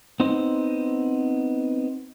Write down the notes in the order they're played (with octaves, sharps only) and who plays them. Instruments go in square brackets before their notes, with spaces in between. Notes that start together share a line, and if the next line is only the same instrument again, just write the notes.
[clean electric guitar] B3 C4 D#4 C5